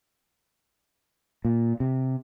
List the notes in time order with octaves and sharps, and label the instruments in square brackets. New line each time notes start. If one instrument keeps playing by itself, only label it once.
[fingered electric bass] A#2
C3